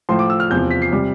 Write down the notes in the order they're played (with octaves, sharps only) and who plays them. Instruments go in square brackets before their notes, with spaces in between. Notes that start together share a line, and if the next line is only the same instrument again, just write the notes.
[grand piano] A2 F3 C6
D6
E6
F6
E2 C3 F3 G6
B6
C7
C3 G3